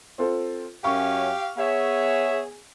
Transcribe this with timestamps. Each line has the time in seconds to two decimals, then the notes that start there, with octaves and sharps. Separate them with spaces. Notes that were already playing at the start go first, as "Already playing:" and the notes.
0.18 C4 F4 A4
0.84 F#2 C#4 G4 F5 C#6
1.57 B3 G#4 C#5 E5